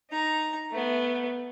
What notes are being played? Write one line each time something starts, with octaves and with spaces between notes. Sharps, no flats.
D#4 A#5
A3 B3